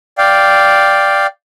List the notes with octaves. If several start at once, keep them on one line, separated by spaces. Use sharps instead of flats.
D5 F5 G5